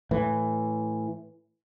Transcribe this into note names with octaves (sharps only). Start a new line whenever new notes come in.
A2 E3